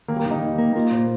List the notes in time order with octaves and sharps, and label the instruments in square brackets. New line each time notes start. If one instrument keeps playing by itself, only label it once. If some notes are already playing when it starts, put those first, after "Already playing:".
[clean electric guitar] D#2 [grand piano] A#3
[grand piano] G3
A#3
[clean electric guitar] D#3
[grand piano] D#4
[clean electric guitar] D#2
A#3
[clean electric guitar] A#3 [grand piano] F4
[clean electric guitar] A#2 [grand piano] C5